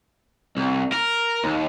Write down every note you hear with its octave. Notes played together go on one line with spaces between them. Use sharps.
C2
A#4
D#2